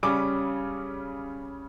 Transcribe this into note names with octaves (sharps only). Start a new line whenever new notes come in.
C#3 G3 C#4 D6